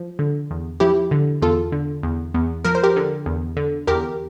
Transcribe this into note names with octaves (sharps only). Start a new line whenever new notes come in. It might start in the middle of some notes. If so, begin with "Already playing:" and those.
Already playing: F3
D3
E2
F3 E4 G4
D3
E2 F4 A4
D3
E2
E2
F3 A#4
C5
G4 A#4
D3
E2
D3
E2 G4 A#4